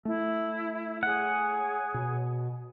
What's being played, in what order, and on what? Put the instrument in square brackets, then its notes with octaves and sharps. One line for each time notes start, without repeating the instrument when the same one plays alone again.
[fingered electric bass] A3 [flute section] E4
[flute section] G#4 C#5 [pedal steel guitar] F#5
[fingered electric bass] B2